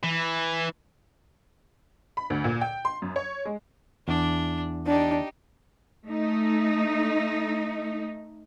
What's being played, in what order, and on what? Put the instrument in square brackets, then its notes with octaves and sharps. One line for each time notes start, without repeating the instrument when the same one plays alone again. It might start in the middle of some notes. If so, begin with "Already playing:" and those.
[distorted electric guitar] E3
[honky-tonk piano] B5
D2
A#2
G5
C6
F#2
C#5
G#3
[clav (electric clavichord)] E2 [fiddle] D4
[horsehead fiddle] D4 [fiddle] D#4 G4
[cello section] A3 D#4